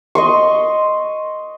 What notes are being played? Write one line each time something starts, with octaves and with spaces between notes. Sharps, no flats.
D#5 C6 C#6